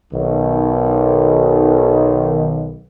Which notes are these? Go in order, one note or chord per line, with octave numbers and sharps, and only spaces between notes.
B1 D#3